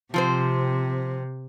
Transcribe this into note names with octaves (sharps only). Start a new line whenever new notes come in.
C3 F3 C4 C5